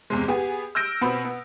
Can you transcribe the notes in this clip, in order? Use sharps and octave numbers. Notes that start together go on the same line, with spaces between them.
E2 C3 G#3
B3 G4 G#4
E6 F6 G6 A#6 D7
B2 B3 C4 B5
B3